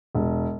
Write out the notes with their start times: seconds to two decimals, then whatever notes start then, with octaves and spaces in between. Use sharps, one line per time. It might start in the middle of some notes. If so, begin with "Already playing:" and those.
0.15 E1